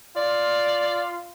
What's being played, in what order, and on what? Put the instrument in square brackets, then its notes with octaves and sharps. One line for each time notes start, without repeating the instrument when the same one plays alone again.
[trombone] F4 [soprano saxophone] D5